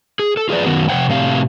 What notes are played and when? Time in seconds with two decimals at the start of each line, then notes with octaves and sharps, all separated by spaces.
0.19 G#4
0.37 A4
0.49 F4 G#4 B4 D5
0.66 F#2 D#3 B3 F#4
0.89 C3 F3 G3 C5 F#5 G5
1.09 A2 C3 C4 G4 F5